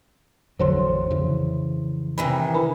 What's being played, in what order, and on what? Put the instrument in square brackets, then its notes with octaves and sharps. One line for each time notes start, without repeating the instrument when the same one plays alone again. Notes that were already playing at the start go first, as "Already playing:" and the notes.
[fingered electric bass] A1 D3 F#3 [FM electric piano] F2 [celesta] C5 C#5 C6
[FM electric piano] F2 [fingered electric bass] C#3 E3
[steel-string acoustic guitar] C3 D#3 E3 [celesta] B5
[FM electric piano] D4 A#4 B4 [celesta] G#5 B5